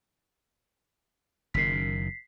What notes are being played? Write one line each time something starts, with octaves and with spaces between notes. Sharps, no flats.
F#1 F#2 D#3 B6 C7